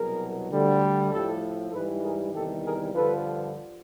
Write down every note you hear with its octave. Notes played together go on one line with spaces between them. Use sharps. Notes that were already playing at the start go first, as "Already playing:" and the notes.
Already playing: C2 B2 F#3 G#4 A#4
D2 D3 G3
A2 F3 G4 A4
G#2 E3 G3 A4 B4
G#4 A#4
E2 C3 D#3 G3 G4 A4
G#4 A#4
G2 D3 F3 A4 B4